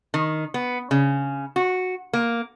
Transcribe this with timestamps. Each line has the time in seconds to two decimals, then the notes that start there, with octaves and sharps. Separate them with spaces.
0.14 D#3
0.54 B3
0.91 C#3
1.56 F#4
2.13 A#3